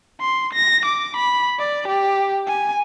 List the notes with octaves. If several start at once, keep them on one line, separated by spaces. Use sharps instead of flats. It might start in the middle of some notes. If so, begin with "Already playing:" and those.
C6
A#6
D6
B5
D5
G4
G#5